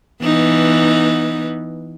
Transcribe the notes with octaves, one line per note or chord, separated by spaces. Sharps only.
E3 B3 D#4